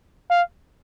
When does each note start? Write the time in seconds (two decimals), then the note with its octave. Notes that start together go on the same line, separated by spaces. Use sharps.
0.30 F5